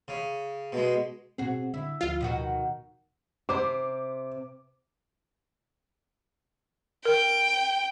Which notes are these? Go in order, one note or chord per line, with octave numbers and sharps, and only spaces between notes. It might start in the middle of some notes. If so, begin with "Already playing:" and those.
C#3
B2 G#3
B2 C4 F#4 G#4
D3 E4
D2 F3 F4
B2 D#3 F#4
C3 C5 D6
A#4 G5